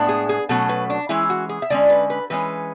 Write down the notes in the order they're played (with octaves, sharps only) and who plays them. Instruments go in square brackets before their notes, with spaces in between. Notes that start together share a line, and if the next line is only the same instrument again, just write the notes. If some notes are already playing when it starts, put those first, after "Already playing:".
Already playing: [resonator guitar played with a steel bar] A2 G#3 B3 D4
G#4
G#4
B2 F#3 A3 C#4 A4
B4
D4
E3 G#3 C#4 E4
F#4
G#4
E5
D3 G#3 C#4 D5
B4
B4
E3 G#3 C#4 B4